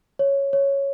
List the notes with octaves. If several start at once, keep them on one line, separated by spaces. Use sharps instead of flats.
C#5
C#5